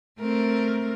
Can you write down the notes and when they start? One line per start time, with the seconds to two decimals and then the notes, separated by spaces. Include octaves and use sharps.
0.20 A3 C4 A#4